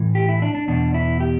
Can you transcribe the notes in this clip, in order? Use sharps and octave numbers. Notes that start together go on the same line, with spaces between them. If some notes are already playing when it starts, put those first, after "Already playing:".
Already playing: A2 E3
G4
E4
D4
D4
E2 B2 D4
E4
G4